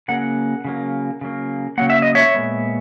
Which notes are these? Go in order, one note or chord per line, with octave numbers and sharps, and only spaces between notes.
C#3 F#3 A#3 F#5
C#3 F#3 A#3
C#3 F#3 A#3
C#3 F#3 A#3 F#5
E5
D#5
C#5 E5
A#2 G#3 B3